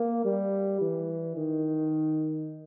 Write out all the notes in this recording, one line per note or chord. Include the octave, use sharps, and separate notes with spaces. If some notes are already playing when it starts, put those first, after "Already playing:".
Already playing: A#3
G3
E3
D#3